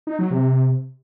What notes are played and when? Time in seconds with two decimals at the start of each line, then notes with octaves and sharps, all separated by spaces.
0.07 D#4
0.19 F#3
0.31 C3